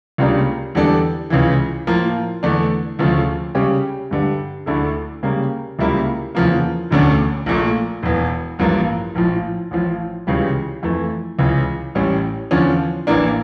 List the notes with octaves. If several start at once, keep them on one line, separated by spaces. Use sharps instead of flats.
C#2 C#3 G3 A#3 D4
E2 D3 G3 D4 A4
C#2 C#3 E3
A2 F3 A#3
E2 D3 A3 D4
D2 C#3 F3 A3
C#3 G3 C#4 G4
G2 D3 G3
D2 D3 A3 E4 A4
C#3 G3 A#3
C#2 C#3 G3 A#3 E4
E2 C#3 F3 A#3
E1 D2 D3 A3 C#4
A#1 A#2 A3
E1 E2 E3
A1 G2 F3 A#3
A#1 A2 F3
A1 A2 F3
C#2 C#3 E3 G3
F2 E3 A3
C#2 C#3 E3
A1 A2 G3 C#4
E2 D3 F3 C#4
A1 A2 E3 A#3 D4